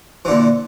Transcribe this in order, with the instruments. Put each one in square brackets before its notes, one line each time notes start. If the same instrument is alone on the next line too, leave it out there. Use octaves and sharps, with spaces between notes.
[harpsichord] E3
D3
A#2